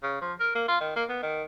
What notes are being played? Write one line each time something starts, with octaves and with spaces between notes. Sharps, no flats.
C#3
F3
A#4
A#3
F4
D#3
A#3
B3
D#3